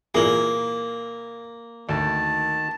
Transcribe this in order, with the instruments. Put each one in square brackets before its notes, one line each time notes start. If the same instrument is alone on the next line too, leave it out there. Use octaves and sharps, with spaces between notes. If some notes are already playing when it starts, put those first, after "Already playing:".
[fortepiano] A#2 E3 G#4 [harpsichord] A#3
[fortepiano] D2 [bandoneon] D#3 A5